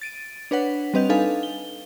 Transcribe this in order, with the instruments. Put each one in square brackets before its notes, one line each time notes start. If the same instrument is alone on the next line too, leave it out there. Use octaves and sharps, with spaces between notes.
[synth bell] A6 D7 D#7
D4 B4 C#5 F#5 B6
G3 C4 B4 D#5 G6 F7
D4 D#4 A4 B4 F5 G#5
G7